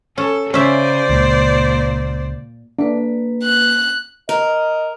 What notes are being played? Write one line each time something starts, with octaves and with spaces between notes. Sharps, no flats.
C#4 A4
C#3 C#4 C5 D5 E5
C#2 A#2
A#3 D4 B4
F#6
A#4 D#5